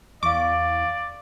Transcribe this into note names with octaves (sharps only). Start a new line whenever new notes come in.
E2 D5 F5 C#6 D6